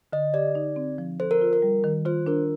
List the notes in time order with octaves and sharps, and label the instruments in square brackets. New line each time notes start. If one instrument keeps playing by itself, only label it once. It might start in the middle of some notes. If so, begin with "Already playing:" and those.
[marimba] D3 [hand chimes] D#5
[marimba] G4 [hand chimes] D5
[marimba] D#4
C4
F3
[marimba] A4 [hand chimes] C5
[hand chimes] A#4
[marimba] F4
[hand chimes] A#4
[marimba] G3
D#3
[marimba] F4 [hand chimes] C5
[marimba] D4 [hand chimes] A#4